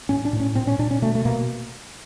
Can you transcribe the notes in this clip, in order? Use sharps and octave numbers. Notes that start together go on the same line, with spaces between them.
A2 C#4
D4
A2
C#4
A#2 C4
C#4
A#2 D4
C#4
B2 A3
A3
B2 A#3